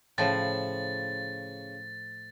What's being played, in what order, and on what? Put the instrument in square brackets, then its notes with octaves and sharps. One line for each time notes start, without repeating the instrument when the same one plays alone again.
[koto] A2 F3 [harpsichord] C#3 [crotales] A6